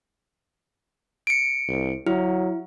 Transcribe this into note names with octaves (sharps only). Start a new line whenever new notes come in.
C#7 D7
C2
F#3 E4